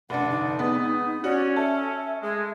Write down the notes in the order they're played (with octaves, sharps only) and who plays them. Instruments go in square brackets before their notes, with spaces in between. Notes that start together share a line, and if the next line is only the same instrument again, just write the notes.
[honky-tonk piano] F1 D4 [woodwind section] G2 D3 D5 [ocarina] F#5
[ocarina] D#4
[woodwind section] G#3 C4 D#6 [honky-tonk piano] B3
[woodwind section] C#4 [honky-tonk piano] F#4 [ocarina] D5
[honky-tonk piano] A4 [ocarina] E5
[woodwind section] G#3 [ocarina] E5